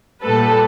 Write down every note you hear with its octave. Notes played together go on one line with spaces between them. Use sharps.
A#2 G3 A4 B4